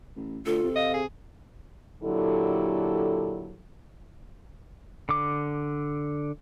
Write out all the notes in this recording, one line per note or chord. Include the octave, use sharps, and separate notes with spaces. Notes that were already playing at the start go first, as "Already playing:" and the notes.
A1
D2 F4 A4
C3
D#5 F5
G#4
A#2 D3 F#3 E4 G4 A4
D3 D6